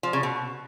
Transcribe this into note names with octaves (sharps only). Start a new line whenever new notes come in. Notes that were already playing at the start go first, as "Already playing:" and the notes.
F3
C#3
B2